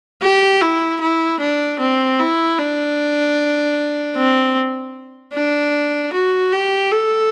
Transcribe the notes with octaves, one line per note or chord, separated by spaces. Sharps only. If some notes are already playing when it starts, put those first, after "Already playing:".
G4
E4
E4
D4
C4
E4
D4
C4
D4
F#4
G4
A4